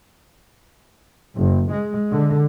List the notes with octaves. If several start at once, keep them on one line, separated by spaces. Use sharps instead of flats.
F#1
G#3
D3